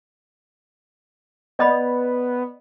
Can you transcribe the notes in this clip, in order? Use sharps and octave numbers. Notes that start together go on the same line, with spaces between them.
B3 D5 D#5 B5